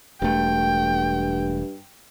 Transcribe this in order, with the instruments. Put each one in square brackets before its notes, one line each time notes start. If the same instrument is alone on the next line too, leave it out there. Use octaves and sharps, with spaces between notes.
[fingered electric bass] E1 A3 [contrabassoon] G2 [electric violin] G5